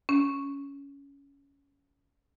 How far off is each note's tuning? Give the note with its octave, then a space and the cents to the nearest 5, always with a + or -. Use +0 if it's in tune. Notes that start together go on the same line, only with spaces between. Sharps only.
C#4 +15